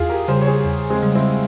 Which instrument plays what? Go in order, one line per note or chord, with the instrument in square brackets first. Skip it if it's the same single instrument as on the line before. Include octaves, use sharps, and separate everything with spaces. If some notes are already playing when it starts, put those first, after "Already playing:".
Already playing: [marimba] E2 [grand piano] F4 G#4
[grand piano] G4 A#4
[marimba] C#3 G3 [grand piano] G#4 C5
[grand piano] C#5
G#4 C5
[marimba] E2
[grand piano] G#3 C4
[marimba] C#3 G3
[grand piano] C4 E4